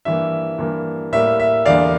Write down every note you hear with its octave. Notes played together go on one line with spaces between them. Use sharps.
G2 E3 A#3 E5
G2 E3 G3 A#3
A2 G3 A#3 E5
E5
E2 D3 G3 A#3 D5 F5